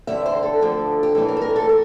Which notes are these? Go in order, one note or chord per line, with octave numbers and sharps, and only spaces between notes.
E2 D3 G3 E5
C5
A4
D2 D3 F3
G4
A2 E3 G3 A4
A#4
A4
A#4
A4
A#4